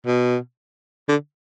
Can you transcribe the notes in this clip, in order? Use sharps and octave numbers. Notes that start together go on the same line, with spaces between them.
B2
D3